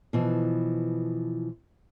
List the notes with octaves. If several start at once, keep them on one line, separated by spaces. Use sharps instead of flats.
B2 E3 F3